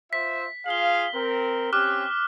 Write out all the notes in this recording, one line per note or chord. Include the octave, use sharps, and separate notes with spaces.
F4 C5 E5 B6
F4 G#4 F5 F#7 G7
C4 A#4
C4 C#4 G4 D6 F6 F#6